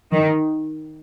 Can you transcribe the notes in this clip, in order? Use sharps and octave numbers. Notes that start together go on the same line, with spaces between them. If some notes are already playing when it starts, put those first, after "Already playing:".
D#3